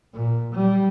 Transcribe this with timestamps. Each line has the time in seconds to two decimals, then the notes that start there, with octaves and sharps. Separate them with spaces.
0.14 A#2
0.55 G3